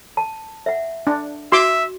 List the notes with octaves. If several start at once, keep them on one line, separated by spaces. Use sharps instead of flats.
A5
E5 F#5
D4
F#4 E5 C6 D6